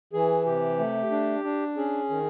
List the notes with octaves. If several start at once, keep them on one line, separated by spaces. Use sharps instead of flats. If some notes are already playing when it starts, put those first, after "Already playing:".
E3 G#4
C3 G4
A3
D4
D4
C#4 G#4
D#3